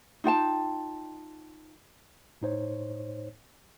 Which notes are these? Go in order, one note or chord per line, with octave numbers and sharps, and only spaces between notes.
D#4 F4 G5 A5
A2 D#4 C5 C#5